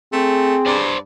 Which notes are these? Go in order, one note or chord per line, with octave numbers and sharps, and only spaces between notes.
A3 C4 G#4
G2 C5 D5